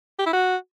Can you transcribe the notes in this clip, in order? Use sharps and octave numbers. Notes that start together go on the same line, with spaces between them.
G4
E4
F#4